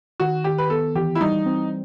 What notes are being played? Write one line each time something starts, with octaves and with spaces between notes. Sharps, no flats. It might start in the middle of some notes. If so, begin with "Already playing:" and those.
D#3 F#4
D#3 G4
B4
B3 A4
E3 G4
E4
G3 D#4
C4